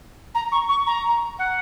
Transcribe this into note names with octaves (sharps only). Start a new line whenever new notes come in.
A#5
C#6
C#6
A#5
F#5